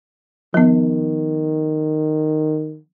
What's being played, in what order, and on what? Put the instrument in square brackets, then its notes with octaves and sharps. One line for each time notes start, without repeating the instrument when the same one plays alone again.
[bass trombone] D#3 [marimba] F3 B3